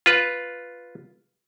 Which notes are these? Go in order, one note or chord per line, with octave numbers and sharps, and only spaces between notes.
F4 B4